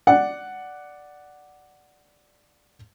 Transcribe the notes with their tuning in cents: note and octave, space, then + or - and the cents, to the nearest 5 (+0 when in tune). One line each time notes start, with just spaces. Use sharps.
D5 +0 F#5 +5